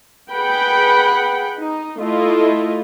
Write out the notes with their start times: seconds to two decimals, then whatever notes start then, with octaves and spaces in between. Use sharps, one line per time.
0.31 G#4 B4 F#5 G5 B5
1.56 D#4
1.99 A3 E4 F4 D#5